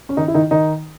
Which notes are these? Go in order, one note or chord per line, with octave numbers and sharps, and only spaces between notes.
C#4
D#3 D#4
E4
D#3 D#4
D#3 D#4